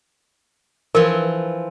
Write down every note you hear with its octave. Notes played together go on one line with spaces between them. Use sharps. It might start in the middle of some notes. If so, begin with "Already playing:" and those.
E3 F3 A#4